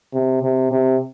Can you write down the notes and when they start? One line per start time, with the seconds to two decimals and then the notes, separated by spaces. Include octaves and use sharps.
0.14 C3
0.43 C3
0.72 C3